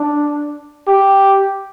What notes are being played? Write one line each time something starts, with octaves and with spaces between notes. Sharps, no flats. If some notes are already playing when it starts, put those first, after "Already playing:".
Already playing: D4
G4